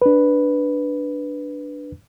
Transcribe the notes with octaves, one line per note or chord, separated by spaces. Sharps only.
D4 B4